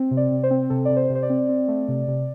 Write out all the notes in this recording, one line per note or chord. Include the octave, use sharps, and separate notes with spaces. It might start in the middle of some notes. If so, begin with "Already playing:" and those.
Already playing: C4
C3
D5
C3
C5
C4
C3 A4
C3 D5
C5
C3
C5
D5
C4
C4
A3
C3
C3